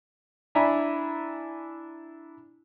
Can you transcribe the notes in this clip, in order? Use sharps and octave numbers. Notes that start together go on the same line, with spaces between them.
D4 E4 E5 G#5 A#5